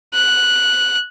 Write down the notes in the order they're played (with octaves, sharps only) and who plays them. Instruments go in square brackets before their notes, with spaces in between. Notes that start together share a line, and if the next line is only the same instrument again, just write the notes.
[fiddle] F#6